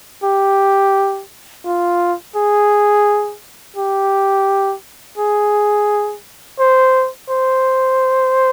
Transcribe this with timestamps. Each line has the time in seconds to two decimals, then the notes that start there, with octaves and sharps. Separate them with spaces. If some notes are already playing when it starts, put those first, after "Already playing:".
0.24 G4
1.65 F4
2.36 G#4
3.77 G4
5.18 G#4
6.59 C5
7.30 C5